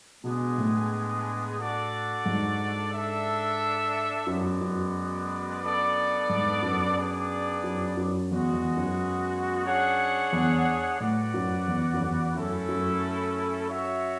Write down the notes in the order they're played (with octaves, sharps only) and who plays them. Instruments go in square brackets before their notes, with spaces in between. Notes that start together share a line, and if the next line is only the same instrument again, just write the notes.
[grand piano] B2 [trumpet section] G#3 B3 D4 G#4
[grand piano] A2
[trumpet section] D4 F#4 A4 D5 F#5
[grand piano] G#2
[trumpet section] D4 A4 E5
[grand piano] F#2 [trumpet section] G#3 B3 F#4 B4 D5
[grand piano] F#2
[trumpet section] B3 D4 A4 D5
[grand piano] G#2
F#2
[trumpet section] B3 D4 G#4 D5
[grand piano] F#2
F#2
[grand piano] E2 [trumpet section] G#3 B3 F#4
[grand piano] E2
F#2
[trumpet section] D4 G#4 C#5 F#5
[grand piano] E2
[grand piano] A2 [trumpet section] F#4 B4 D5 F#5
[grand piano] F#2
E2
F#2
E2
[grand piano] F#2 [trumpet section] A3 C#4 E4 A4
[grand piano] F#2
[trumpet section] F#4 C#5 E5